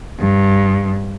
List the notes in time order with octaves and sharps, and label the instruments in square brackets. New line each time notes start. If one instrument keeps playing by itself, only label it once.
[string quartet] G2